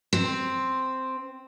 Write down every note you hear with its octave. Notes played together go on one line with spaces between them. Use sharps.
C4